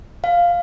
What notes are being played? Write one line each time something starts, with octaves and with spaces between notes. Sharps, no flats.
F5